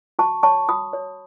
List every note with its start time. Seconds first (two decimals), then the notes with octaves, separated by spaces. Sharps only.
0.19 F#4 A5 C#6
0.43 C#5 A5 C#6
0.69 F#4 B5 D#6
0.93 C#5